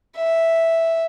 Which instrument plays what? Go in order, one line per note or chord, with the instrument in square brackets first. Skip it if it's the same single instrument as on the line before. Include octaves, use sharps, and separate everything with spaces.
[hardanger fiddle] E5